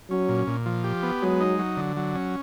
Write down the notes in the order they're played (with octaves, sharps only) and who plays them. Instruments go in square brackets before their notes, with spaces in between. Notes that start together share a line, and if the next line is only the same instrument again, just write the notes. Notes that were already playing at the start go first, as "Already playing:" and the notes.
[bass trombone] F#3 [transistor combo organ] C#4
[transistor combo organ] A#2
A#2
F3
G4
B3
[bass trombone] F#3 [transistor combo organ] G#3
[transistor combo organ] D#4
F#3
D3
F#3
C#4